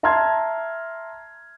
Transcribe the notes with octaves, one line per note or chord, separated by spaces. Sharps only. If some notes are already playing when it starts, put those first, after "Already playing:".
E5 A5 A#5 C6 F6 G#6